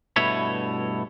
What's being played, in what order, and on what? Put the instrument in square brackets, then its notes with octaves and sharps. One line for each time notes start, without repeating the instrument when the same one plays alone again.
[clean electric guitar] G2 B2 A3 E4 C#5 B5